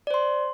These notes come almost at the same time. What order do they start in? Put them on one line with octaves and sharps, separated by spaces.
D5 C5 C6